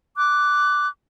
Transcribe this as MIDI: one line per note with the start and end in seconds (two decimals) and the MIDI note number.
0.17 0.87 86
0.17 0.87 90